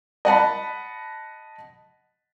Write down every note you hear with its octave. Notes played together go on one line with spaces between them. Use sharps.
D#5 F#5 A5 B5